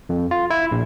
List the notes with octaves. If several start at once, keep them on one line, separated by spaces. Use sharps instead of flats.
F2
F4
E4
A#1